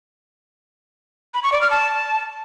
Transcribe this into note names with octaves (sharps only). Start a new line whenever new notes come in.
B5
C#6
D5
F6
A5